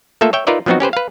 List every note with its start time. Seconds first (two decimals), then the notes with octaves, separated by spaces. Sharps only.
0.21 A3 A#3 F4 A4 E5
0.33 C#5 E5 G5
0.47 D#4 F4 A#4 B4 D5 E5
0.66 F3 F#3 B3 C4 D#4 F#4
0.80 C#4 G4 B4 C5
0.93 B4 F5